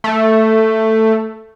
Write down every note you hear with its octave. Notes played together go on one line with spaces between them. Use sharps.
A3